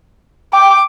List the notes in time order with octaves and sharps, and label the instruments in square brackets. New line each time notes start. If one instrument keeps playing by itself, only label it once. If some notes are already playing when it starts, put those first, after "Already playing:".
[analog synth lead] G5 [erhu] D6